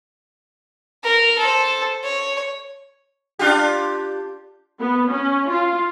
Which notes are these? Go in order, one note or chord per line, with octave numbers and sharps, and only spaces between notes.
A#4
A4 C5
C#5
D4 F4 G4
B3
C#4
F4